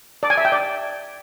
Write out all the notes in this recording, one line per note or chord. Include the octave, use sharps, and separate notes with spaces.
D5
G#5
E5
G5
D5